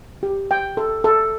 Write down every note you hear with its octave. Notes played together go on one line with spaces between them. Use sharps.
G4
G5
A4
A4